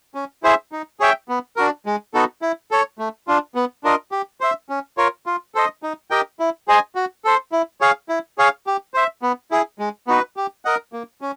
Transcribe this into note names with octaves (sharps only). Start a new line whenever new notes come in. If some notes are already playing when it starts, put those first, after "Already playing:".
C#4
E4 G#4 C5 E5
D#4
G#4 C#5 E5 G5
B3
D4 F#4 A#4
G#3
B3 D#4 F#4 A4
E4
A4 C#5
A3
D4 F4
B3
D4 F4 A#4 D#5
G4
C5 E5
C#4
F4 A#4 C#5
F4
A4 C5 D#5
D#4
G4 A#4 D#5 G5
E4
G#4 C5 D#5 G#5
F#4
A4 C5
E4
G#4 C#5 F5
E4
G#4 C#5 F5
G4
C5 E5
B3
E4 G#4
G#3
B3 D#4 F#4 B4
G4
A#4 D#5 F#5
A#3
C#4